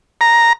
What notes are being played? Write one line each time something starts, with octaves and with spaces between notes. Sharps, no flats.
A#5